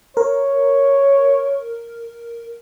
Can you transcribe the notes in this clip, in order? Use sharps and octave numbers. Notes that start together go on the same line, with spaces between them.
A#4 C#5